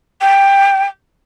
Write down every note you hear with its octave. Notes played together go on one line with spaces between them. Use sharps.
G5